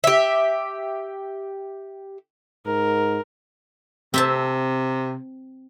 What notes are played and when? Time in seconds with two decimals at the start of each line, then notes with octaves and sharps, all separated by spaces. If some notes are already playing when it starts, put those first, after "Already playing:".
0.04 G4 E5
2.66 G#2 A#4
4.14 C3 C4 E5 A5